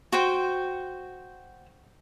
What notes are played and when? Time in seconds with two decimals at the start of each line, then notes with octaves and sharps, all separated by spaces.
0.12 F#4 C5 G5